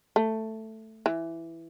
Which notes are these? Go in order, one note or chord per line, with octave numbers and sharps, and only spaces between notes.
A3
E3